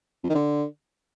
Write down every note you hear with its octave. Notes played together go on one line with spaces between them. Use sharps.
F2
D#3
D3